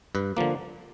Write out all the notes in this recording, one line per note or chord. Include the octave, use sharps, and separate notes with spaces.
G2 B4
D3 F3 A#3